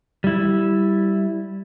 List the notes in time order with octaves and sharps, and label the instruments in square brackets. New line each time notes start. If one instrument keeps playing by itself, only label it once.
[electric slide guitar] G3 E4